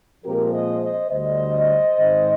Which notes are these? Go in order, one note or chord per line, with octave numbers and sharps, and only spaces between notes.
A#2 F3 G#3 C4 G4 A#4
C5 D#5
C5 D#5
D2 D3 G3 C5 D#5
G#2 D#3 G#3 C4